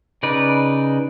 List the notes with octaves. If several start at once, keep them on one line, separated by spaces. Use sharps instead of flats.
C#3 D#4 B4 D5